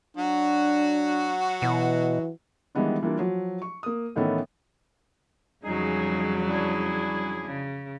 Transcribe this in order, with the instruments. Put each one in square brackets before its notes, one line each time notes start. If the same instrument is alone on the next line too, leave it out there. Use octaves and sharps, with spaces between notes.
[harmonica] F#3 F#4 [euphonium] D4
[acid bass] B2 [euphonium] E3
[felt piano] D#3 E3 G3 G#3 B3 D4
E3 G3 A#3 D4 F4
F3 F#3
C#6
A#3 D#6
A2 D#3 E3 B3 C#4 A4
[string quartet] F2 C#3 F#3 [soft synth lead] G3 [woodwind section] D#4 G#4
[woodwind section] D4 E4 G#4
[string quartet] C#3